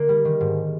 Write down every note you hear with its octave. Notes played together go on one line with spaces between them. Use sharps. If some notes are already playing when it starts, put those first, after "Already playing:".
Already playing: D3 A#3
G3
D#3
G#2